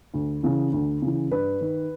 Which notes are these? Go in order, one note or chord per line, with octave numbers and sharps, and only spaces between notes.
D2
C#3 E3
D2
C#3 E3
G2 B4
D#3